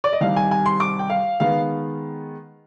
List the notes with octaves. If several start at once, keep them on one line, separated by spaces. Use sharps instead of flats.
D5
D#5
C2 C3 D#3 G3 F5
G#5
G#5
C6
D6
G5
F5
D#3 G#3 B3 F5